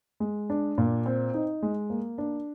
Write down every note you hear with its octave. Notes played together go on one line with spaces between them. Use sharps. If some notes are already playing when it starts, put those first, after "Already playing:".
G#3
D4
A#2
C4
D#4
G#3
A#3
D4